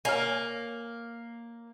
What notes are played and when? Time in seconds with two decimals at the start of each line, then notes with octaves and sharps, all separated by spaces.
0.05 A#3 A#4 C#5 G#5